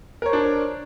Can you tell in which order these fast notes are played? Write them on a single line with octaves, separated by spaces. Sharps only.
A#4 C#5 C5 D4